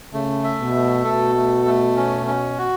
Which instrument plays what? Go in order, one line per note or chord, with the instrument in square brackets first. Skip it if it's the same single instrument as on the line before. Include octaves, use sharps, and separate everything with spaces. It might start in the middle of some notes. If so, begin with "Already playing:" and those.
[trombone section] C#3 [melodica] A3
[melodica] E5
[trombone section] B2
[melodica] A3
[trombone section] B2 [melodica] A4
[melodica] A3
A3
C#4
C#4
F#4